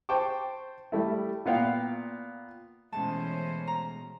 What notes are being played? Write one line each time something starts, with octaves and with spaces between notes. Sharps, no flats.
C5 G5 A5 C#6 D6
G3 A3 E4
A#2 B3 F5 G5
B2 E3 G#3 A3 C#4 C5 A5
A#5